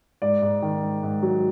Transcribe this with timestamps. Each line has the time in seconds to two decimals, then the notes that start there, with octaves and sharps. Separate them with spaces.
0.22 G#2 D5
0.42 G#2
0.62 D#3
0.83 G#2
1.03 G#2
1.23 F#3